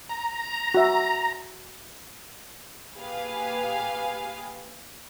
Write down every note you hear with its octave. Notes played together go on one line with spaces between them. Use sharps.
A#5
F#4 E5
A#2 G4 G#4 B4 F5 G#5